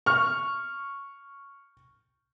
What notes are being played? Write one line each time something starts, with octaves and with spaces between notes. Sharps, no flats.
C#6 F6